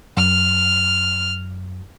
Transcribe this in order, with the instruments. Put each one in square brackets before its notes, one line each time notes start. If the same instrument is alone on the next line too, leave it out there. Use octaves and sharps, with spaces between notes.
[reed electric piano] F#2 [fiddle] F6